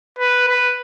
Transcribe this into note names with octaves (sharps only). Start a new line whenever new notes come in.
B4
B4